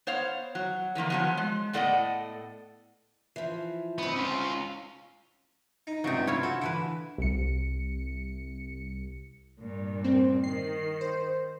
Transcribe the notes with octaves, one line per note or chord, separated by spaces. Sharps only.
B3 C5 C#5 F5
F#3
D3 E3 F3 A#3
F3 F#3 B3
G#3
A2 B3 A4 D5 D#5 F#5
E3 F3
B3 C4 D#4
C#4 F4
D#4
C#2 G2 C3 F#3 D#4
E4 F4 C#5
F#4 A4
D3 E3 E4 B4
C2 C#7
G2 A#2
C4
D#3 C7
C5